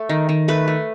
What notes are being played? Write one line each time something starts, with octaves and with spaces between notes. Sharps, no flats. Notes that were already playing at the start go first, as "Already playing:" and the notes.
Already playing: A3
D#3
D#3
A3 B4
A3